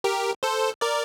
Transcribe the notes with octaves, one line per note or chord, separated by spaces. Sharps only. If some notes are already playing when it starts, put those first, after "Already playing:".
G4 A#4
A4 C5
A#4 D5